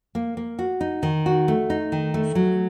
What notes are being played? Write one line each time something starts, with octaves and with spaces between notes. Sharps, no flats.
A#3
A#3
F#4
D#4
D#3
F#4
A3
D#4
D#3
A3
F#3